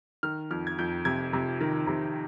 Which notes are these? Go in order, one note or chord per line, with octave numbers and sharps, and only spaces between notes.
D#3 F6
F2 F6
G#6
F2 G6
C3 G#6
C3
D#3
C3